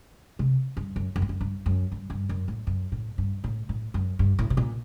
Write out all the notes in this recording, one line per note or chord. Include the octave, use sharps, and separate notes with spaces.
C3
G2
F#2
F#2
G2
F#2
G2
F#2
G2
G2
F#2
A2
F#2
A2
G2
A2
A2
F#2
G2
A2
C3
A#2